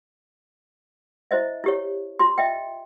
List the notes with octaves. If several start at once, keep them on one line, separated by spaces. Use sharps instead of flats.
E4 C5 D#5 E5
E4 G4 C#5
F4 C6
D#5 E5 G5